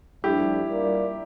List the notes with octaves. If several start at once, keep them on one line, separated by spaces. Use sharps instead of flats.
G2 F3 A3 D4 E4 G4
G3 A#3 F4 A#4 D5